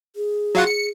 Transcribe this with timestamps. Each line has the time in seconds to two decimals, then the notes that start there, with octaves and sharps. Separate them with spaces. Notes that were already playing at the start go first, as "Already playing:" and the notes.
0.16 G#4
0.55 F#3 F4 F#5
0.67 C#7